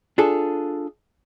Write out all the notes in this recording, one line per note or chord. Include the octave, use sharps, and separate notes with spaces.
D4 F4 G#4 A4